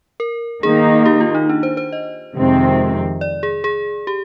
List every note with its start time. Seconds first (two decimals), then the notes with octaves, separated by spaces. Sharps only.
0.20 A#4
0.63 D#3 A#3 D#4 G#4
1.05 G4
1.20 F4
1.35 D#4
1.49 D4
1.63 C5
1.77 C5
1.92 D#5
2.35 F2 C3 D#3 G#3 C4
3.21 D5
3.43 G#4
3.64 G#4
4.07 G4